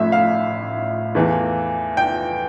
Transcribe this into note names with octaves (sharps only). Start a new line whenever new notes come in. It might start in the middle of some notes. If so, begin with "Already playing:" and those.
Already playing: A1 A2 F3 A3 E5
F5
E2 E3 A3
G5